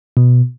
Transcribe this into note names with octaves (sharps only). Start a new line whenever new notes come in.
B2